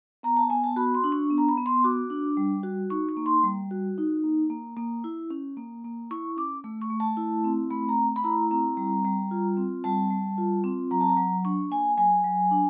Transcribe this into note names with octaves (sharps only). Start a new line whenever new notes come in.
B3 A#5
A5
B3 G#5
A5
F#4 B5
C6
D4
C#6
B3
A#5
B5
B3
C6
F#4 D6
D4
G3
F#4
D#4 C#6
C#6
A#3
C6
G3
F#4
D#4
A#3
A#3
A#3
E4
C#4
A#3
A#3
E4 C#6
C#4 D6
A3
C#6
A3
A5
E4
C4
A3 B5
A#5
A3
B5
E4 A#5
C4 A#5
G3
G3
F4
C4
G3 A5
G3
F4
C4
F#3 A#5
A5
A#5
F#3
D4 C#6
A#3 G#5
F#3 G#5
F#3
D4